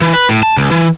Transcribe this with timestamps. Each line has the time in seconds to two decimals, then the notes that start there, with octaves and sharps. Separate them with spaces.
0.01 E3
0.14 B4
0.29 A2
0.43 A5
0.57 C#2
0.71 E3